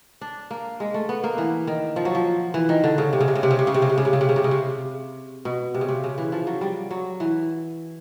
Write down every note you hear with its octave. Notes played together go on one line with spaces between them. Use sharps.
D4
A#3
G#3
A3
B3
A#3
E3
D#3
F3
F#3
F3
E3
D#3
D3
C#3
C3
C#3
C3
C#3
C3
C#3
C3
C#3
C3
C#3
C3
C#3
C3
C#3
C3
C#3
C3
C#3
C3
B2
C3
C#3
C3
C#3
E3
F3
F#3
G3
F#3
E3